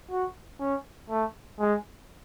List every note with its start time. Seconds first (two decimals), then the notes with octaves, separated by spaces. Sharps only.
0.11 F#4
0.60 C#4
1.10 A3
1.60 G#3